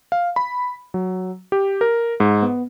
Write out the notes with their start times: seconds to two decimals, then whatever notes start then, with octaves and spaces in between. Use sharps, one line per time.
0.12 F5
0.36 B5
0.94 F#3
1.52 G4
1.81 A#4
2.20 G#2
2.43 B3